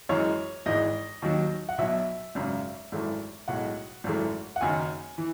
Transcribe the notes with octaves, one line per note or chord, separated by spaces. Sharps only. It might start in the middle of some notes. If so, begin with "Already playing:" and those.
F#2 E3 G#3 C#5
G#1 G#2 E3 G#3 D#5
D#2 D#3 F#3
F#5
B1 B2 F#3 E5
G#1 F#2 C#3
G#1 F#2 E3 A3
B1 A2 G#3 F#5
G#1 F#2 E3 A3
F#5
F#1 F#2 D#3 G#5
E3